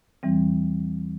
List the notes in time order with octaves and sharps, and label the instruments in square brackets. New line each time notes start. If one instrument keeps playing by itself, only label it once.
[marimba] E2 E3 G3 C4